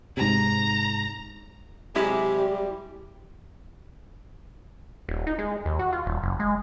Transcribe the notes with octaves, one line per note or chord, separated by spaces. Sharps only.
G#2 C3 A#5
C3 F#3 G#3 E4 G4 G#4
G3
D#1
D#4
G#3
D#2
F#4
F4
D#1
F#1
G#3